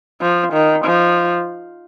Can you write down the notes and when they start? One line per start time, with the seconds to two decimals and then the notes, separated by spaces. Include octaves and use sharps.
0.21 F3
0.53 D#3
0.85 F3